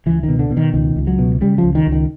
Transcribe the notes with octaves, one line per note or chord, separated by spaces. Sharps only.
C#2 E3
D#3
B2
D3
B2
D#3
C#2 D#3
C#2
F#3
B2
C#3 G3
F3
C#2
D#3
C#2
D#3